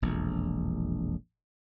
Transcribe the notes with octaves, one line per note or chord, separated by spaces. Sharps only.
E1 A#1 F2